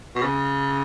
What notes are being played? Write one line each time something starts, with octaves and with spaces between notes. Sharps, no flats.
B2
C#3